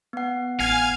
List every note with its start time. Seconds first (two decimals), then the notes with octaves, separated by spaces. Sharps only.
0.13 B3 F#5
0.60 A1 F5 G#5 F6 G#6